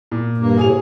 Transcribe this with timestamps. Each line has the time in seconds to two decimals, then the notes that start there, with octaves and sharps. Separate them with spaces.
0.12 A#2
0.38 G2 A#3
0.57 A2 C3 G#4 G#5 F7